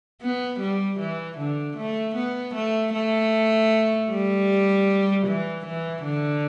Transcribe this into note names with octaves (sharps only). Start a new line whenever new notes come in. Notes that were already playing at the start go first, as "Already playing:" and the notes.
B3
G3
E3
D3
A3
B3
A3
A3
G3
E3
E3
D3